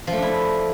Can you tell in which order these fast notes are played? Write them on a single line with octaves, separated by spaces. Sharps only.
F3 A3 D4 E4